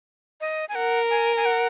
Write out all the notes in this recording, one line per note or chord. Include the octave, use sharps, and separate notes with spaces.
D#5
G#5
A#4 F#5
G#5
G#5
F#5